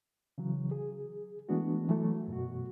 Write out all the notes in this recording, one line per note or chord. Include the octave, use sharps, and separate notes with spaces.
C#3 E3 F#3
G#4
E3 G#3 A3 B3 D4 F#4
E3 F#3 A3
F#2 B2 F#4